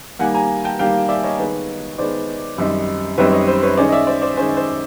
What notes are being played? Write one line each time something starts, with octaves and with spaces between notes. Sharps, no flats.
D#3 G3 A#3 F#5 G#5
G#5 A#5
G5 A5
D#3 G3 A#3 F5 G5
D5 E5
C#5 D#5
D#3 G#3 B3
D#3 G#3 B3 C5 D5
F#2 D#3 G3 C4 D#4
F#2 D#3 G3 C4 D#4 B4 C#5
C#5 D#5
C5
B4 C#5
D#3 G#3 C#4 C5 D5
D#5
D5 E5
C5 D5
C5 D5
D#3 G#3 C#4 C5
C5